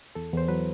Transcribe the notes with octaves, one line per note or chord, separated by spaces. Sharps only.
E2 A4
E2 C5
F#3 B4